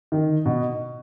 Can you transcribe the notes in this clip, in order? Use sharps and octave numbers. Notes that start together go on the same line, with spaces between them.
D#3
B2